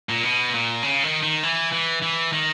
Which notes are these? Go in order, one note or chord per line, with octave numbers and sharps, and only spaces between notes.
A#2
B2
A#2
C#3
D#3
D#3
E3
E3
E3
D#3